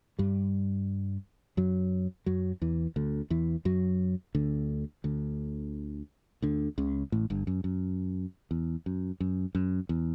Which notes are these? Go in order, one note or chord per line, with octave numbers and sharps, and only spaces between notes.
G2 G3
F#2 F#3
F#2 F#3
E2 E3
D2 D3
E2 E3
F#2 F#3
D2 D3
D2 D3
D2 D3
C#2 C#3
A1 A2
G1 G2
F#2
F#2
E2
F#2
F#2
F#2
E2